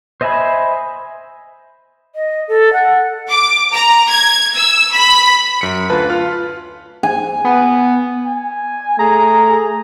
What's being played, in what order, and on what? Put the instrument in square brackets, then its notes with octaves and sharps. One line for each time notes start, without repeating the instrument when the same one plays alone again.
[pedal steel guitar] C5 D#5 E5 G#5 B5
[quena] D#5
A4
F#5
[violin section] D6
A#5
G#6
E6
B5
[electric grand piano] F#2 C#7
D2 F4 B4 A5
F4 F6
[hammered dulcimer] G#5
[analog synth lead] B3
[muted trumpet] G#5
[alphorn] A3 [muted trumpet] G#4 [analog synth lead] A#5